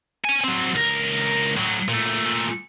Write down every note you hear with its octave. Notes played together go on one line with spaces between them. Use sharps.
C#5 G#5
F#3 C4
C#2 A#4
A2 F#3
A#2 A3